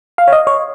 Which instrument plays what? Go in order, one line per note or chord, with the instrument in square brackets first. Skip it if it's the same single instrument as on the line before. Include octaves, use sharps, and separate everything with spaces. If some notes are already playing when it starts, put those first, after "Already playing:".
[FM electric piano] F5
C#5
D#5
C#5